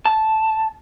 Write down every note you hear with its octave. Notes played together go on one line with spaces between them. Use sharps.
A5